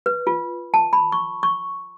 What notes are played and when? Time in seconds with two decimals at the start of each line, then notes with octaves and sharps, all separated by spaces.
0.06 B4
0.27 F4
0.74 A5
0.93 B5
1.12 C#6
1.43 C#6